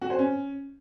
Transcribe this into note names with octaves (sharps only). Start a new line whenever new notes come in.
F#4
C5
C#4